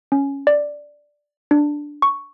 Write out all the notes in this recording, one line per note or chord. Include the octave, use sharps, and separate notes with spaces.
C#4
D5
D4
C#6